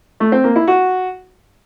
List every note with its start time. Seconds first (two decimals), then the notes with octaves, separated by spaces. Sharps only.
0.20 A3
0.32 C4
0.44 A#3
0.56 E4
0.67 F#4